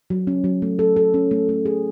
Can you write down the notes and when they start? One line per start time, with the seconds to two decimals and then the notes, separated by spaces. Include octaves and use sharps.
0.10 F#3
0.27 C#4
0.44 F#3
0.62 A3
0.79 A4
0.96 A4
1.14 C#4
1.31 A3
1.49 A3
1.66 G#4